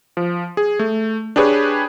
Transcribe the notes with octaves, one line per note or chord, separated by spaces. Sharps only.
F3
G#4
A3
D4 G4 G#4 B4 C#5